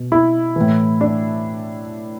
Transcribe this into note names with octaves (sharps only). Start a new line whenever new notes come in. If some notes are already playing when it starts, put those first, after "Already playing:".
Already playing: B2
E4
A2 E3
D4